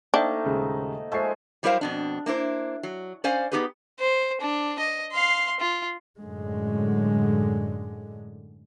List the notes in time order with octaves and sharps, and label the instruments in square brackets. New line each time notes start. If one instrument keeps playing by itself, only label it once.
[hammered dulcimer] A3 A#3 D#4 [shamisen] D4 [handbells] C5 E5 G5
[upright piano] D#1 C#3 G#3
[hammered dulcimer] F3 G#3 A3 [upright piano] E5 C7
[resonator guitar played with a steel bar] F#3 G3 E4 A#4 C5 F5
F2 B2 D4
A#3 D4 E4 C5
F#3
C#4 C5 D5 F5 G#5
B3 C4 D#4 G4 G#4 B4
[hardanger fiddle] C5
D4
D#5
F5 C6
F4
[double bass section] F#2 A2 D3 G#3